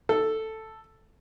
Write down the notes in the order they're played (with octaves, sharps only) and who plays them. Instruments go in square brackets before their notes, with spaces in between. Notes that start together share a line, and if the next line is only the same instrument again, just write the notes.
[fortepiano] A4